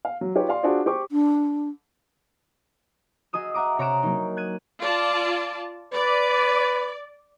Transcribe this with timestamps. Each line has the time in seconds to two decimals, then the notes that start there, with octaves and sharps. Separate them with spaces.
0.05 F5
0.21 F#3
0.35 D#4 F4 G4 B4 C#5
0.48 D5 F5 C6
0.63 D4 F4 F#4 G#4 C5 D5
0.86 G4 C5 C#6 D6
1.11 D4
3.33 F#4 G#4 D#5 D#6 E6
3.54 E5 F#5 A#5 D6 D#6
3.78 C3 C#5 A#5 F#6 D7 E7
4.03 F#3 A#3 D#4
4.37 F#6 G#6 D#7
4.80 F4 D5 A5
5.93 B4 D5